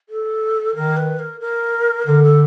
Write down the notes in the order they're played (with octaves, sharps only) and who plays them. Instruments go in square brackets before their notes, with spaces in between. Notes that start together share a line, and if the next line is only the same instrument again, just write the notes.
[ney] A4
[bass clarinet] D#3 [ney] A#4
[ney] B4
A#4
A#4
[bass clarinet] D3 [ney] A#4
[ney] A4